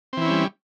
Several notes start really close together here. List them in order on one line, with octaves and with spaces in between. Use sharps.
C4 E3 E4 C#4 G3